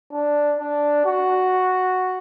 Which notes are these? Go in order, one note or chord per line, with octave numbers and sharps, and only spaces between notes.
D4
D4
F#4